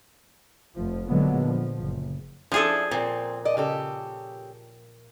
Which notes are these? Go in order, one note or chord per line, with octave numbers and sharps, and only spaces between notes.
F1 F3
A#2 D3 F#3 G#3 A#3 B3
F3
F#1
F3 D4 E4 G#4 A4
A#2 C4
D5 D#5
C#3 G4 A4